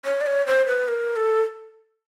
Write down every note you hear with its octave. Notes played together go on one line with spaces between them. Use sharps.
C#5
D5
C#5
C5
B4
A#4
A4